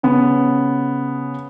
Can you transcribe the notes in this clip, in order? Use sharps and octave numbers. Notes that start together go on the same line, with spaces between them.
C#3 B3